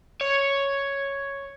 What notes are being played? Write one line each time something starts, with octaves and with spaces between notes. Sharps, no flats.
C#5